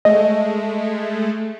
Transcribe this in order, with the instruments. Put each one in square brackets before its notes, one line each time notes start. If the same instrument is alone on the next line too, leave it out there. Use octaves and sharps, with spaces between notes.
[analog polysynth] G#3 A3 [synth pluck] D#5